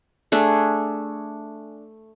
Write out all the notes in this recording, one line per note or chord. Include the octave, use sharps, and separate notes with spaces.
A3 D4 G#4 A4